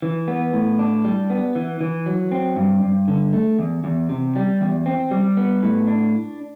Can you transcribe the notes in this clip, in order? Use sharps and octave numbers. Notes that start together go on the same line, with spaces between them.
E3
B3
A2
D4
G3
B3
E3
E3
F#3
C4
G2
G2
D3
A3
E2
E2
C3
G3
E2
C4
G3
B3
A2
D4